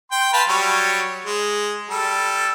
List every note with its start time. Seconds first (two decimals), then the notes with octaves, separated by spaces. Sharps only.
0.11 G5 C6
0.33 B4 F5 A5
0.49 F#3 G3 C#5
1.26 G#3
1.90 G3 A4